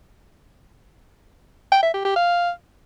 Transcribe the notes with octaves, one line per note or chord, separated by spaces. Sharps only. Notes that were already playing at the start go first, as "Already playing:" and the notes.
G5
E5
G4
G4
F5